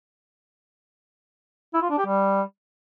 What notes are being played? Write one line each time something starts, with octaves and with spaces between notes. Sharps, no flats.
E4
F4
D4
G4
G3